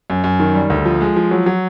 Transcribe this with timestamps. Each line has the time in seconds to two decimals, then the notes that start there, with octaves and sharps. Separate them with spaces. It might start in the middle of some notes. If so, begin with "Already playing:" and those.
0.10 F#2
0.24 F#2
0.40 D#3
0.55 G3
0.70 D2
0.85 F3
1.01 G#3
1.16 F3
1.31 F#3
1.46 F#3